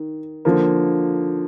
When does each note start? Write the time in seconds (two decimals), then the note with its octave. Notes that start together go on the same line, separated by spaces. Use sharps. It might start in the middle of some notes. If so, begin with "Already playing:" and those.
Already playing: D#3
0.45 D3 F3 A#3